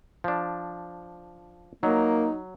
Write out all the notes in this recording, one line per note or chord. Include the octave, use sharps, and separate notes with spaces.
F3 D4
F#3 A#3 D#4